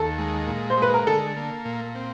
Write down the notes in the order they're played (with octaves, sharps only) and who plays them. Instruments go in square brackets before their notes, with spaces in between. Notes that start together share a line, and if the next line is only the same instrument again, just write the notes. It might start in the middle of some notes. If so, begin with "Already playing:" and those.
Already playing: [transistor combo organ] D#2 [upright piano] A4
[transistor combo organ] G#3
A#2
[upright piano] C5
[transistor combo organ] G#3
[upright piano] B4
A#4
[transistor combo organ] D3 [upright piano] A4
[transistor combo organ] A#3
A#2
C4